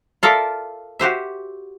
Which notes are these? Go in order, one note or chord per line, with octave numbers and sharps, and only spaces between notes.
F4 A4 A#4 D5 E5
F#4 G4 C5 E5